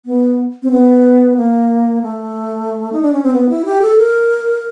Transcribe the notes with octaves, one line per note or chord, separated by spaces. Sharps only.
B3
C4
B3
A#3
A3
D#4
D4
C#4
C4
B3
E4
G4
A4
A#4